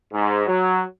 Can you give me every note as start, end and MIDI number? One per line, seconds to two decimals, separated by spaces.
0.13 0.46 44
0.47 0.82 54